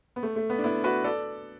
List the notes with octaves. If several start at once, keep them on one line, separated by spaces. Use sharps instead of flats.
B3
A3
A3
B3
D4
B3 E4
F#4 B4
A4 D5